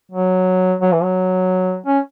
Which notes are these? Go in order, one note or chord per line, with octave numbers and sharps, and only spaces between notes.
F#3
F#3
E3
F#3
C#4